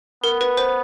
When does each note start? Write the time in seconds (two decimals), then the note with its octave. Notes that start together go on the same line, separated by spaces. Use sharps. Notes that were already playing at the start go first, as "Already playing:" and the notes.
0.24 B3 A#4
0.41 B4
0.57 C5